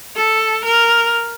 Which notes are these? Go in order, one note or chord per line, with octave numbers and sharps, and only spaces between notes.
A4
A#4